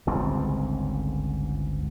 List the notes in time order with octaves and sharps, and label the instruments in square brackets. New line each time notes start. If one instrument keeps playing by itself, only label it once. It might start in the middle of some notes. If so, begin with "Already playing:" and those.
[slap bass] G1 C#2 G#2 C4